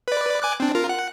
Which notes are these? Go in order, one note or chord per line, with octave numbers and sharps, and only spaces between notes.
B4 D5
G#5 D6 F#6
C4 D4
F4 A#4
F#5